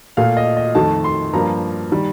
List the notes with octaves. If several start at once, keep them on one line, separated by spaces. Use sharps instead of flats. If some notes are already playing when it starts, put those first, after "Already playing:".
A#2 A3 F5
D#5
D#5
F2 D#3 A3 A5
C6
G2 F3 A#3 A#5
D#3 G3